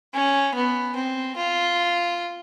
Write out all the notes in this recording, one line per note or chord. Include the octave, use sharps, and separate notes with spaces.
C#4
B3
C4
F4